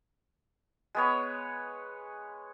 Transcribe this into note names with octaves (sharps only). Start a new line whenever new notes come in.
G#3 B3 C#5